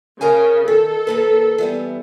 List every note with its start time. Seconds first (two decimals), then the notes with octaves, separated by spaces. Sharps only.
0.21 C#3 A#4 F5 G#5
0.68 D#3 A4
1.07 D#2 A#3 B4
1.58 E3 G3 B3